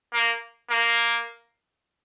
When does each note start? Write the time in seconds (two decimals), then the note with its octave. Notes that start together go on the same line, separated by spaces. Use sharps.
0.14 A#3
0.70 A#3